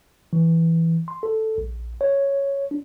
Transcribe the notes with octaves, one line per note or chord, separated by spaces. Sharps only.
E3
C6
A4
A#1
C#5
D4